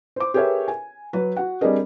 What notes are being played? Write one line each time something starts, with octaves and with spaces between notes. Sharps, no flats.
C5 D6
G4 G#4 A#4 B4 C#5 E5
G#5
F#3 B4
F#4 F#5
G3 C4 D4 G#4 A#4 D#5